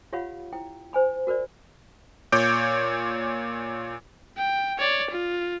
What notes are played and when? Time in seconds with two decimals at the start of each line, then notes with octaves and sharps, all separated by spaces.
0.13 F4 G4 C#5 F5 F#5 B5
0.53 E4 G5
0.93 C5 G#5 B5
1.27 F#4 A#4 C5 D5
2.32 A#2 C#5 D6 G6 D7
4.37 G5
4.79 C#5 D5
5.10 F4